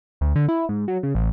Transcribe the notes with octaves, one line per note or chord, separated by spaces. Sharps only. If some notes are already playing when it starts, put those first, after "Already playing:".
D2
D3
E4
G#2
F#3
C#3
A1